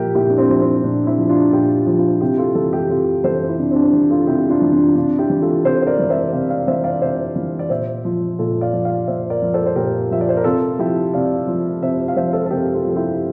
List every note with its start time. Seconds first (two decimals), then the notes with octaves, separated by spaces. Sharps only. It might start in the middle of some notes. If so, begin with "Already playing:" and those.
Already playing: A#2 F3 G4 A#4 E5
0.15 A#2 E4 G4
0.30 D4
0.38 C4 E4
0.49 F3
0.61 C4
0.84 A#2 D4
1.07 C4 E4
1.18 F3
1.29 D4 F4
1.52 A#2 E4 G4
1.86 F3
1.98 D4 F4
2.21 C3 E4 G4
2.38 F4 A4
2.55 E3 F4 A4
2.72 E4 G4
2.90 C3 F4 A4
3.24 E3 A4 C5
3.49 E4
3.59 C3 D4
3.71 C4
3.76 D4
3.93 E3
4.10 F4 A4
4.27 C3 E4 G4
4.39 G4
4.49 D4 F4
4.61 E3
4.72 D4 F4
4.96 C3 D4 F4
5.18 E4 G4
5.30 E3
5.41 F4 A4
5.64 C3 A4 C5
5.82 C5
5.87 A#4 D5
5.99 E3
6.10 C5 E5
6.33 C3 D5 F5
6.50 D5 F5
6.68 E3 C5 E5
6.84 D5 F5
7.01 C3 C5 E5
7.36 E3
7.59 D5
7.70 A#2 C5 E5
8.05 F3
8.39 A#2 F4 A4
8.61 D5 F5
8.73 F3
8.85 D5 F5
9.07 A#2 C5 E5
9.30 A#4 D5
9.42 F3
9.54 A4 C5
9.66 C5
9.76 A#2 G4 A#4
10.11 F3 E5
10.21 D5
10.29 C5
10.37 A#4
10.44 C3 F4 A4
10.79 F3 E4 G4
11.14 C3 D5 F5
11.47 F3
11.82 C3 C5 E5
12.08 F5
12.16 F3 C5 E5
12.33 A4 C5
12.46 A4
12.51 C3 G4 A#4
12.74 F4 A4
12.85 F3 A4
12.96 E4 G4